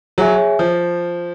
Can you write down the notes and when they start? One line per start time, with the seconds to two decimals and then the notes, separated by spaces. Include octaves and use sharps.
0.18 F#3 G#4 C#5 E5 G#5
0.59 F3